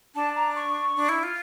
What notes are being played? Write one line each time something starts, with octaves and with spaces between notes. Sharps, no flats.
D4 A5
A#5
C#6
D4
E4
F4